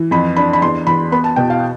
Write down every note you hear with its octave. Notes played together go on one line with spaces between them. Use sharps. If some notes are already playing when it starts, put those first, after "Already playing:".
Already playing: E3
F2 B5
D4 B5
B5
E2 C6
E2 B5
B3 B5
A5
B2 G5
F5